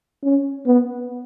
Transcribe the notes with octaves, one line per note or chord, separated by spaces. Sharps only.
C#4
B3